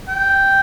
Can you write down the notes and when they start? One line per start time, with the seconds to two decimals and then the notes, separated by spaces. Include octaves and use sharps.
0.08 G5